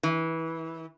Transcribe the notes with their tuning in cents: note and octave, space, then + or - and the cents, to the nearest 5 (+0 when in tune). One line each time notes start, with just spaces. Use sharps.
E3 -20